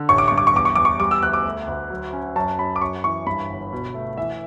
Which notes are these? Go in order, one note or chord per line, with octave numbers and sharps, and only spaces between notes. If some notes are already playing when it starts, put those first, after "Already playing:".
Already playing: D3
A1 C#6
D6
G2 C#6
D6
C#6
E2 D6
C#6
E2 D6
C#6
G3 D6
E6
D2 F#6
D6
A3
D2
F#3
C#4
F#2 A5
F#2 B5
D6
F#2 C#6
E3 C#6
G2 B5
G1
B2
A3
E3 E5